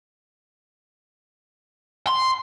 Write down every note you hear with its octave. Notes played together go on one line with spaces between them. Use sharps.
C6